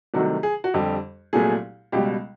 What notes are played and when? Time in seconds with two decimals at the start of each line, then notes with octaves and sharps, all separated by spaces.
0.14 C2 C3 D#3 F#3 A3 F#4
0.43 G#4
0.64 F#4
0.74 F2 D3 G3 G4
1.33 C2 A#2 F#3 A3 G#4
1.92 C#2 B2 G3 G4